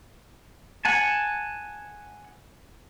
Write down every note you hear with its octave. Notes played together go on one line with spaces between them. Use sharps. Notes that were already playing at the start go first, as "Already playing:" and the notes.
F#5 G#5 A5